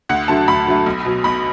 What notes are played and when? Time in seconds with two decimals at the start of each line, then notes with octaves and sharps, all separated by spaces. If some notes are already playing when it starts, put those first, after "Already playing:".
0.09 D2 F#5
0.28 D3 F#3 A3 A5
0.48 D2 B5
0.67 D3 F#3 A3
0.86 B1
1.05 B2 F#3
1.24 B1 B5